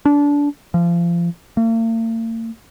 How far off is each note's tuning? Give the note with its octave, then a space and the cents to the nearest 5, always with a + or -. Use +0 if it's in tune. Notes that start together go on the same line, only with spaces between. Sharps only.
D4 -25
F3 -30
A#3 -45